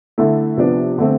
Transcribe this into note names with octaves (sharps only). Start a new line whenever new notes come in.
D3 A3 E4
C3 F3 B3 D4
D3 A3 C4